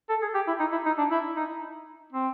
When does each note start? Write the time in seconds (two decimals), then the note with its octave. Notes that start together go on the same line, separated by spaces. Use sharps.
0.09 A4
0.22 G#4
0.35 G4
0.47 E4
0.60 D#4
0.72 E4
0.86 D#4
0.98 D4
1.11 E4
1.36 D#4
2.13 C4